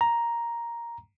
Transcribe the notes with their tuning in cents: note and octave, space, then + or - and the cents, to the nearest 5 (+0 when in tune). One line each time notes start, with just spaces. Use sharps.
A#5 +5